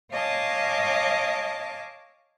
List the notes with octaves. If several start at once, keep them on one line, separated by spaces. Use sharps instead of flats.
C#5 D#5 F5 G#5 A5 D6